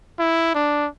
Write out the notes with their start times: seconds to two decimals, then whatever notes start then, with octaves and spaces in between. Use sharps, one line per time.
0.19 E4
0.55 D4